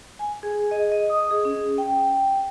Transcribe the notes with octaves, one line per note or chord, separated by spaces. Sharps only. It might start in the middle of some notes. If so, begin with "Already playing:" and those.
G#5
G#4
D#5
D#5
D#6
G#4
C#4
G5